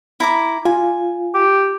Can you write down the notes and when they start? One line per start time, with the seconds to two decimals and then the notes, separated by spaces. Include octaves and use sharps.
0.20 E4 A#5 D6
0.65 F4 G#5
1.34 G4